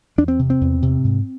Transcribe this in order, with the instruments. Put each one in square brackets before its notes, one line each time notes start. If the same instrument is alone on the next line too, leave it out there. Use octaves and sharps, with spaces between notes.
[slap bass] E2 D4
C4
C3
C4
E2
C3
G#2